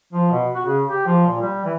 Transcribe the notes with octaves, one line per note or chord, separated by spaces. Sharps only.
F3
B2
F#4
C#3
G4
F3
A#2
G3
E3